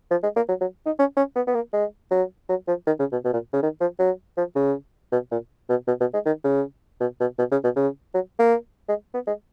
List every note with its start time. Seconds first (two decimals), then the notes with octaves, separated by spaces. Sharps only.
0.11 F3
0.23 G#3
0.36 A#3
0.49 F#3
0.61 F#3
0.86 D#4
0.99 C#4
1.17 C#4
1.35 B3
1.47 B3
1.55 A#3
1.73 G#3
2.11 F#3
2.49 F#3
2.67 F3
2.87 D#3
2.99 C#3
3.12 B2
3.25 B2
3.33 A#2
3.53 C#3
3.62 D#3
3.81 F3
3.99 F#3
4.37 F3
4.55 C#3
5.12 B2
5.31 A#2
5.69 B2
5.87 B2
6.00 B2
6.13 G#3
6.26 D#3
6.44 C#3
7.00 B2
7.20 B2
7.38 B2
7.52 C#3
7.64 B2
7.76 C#3
8.14 F#3
8.39 A#3
8.89 G#3
9.14 B3
9.27 G#3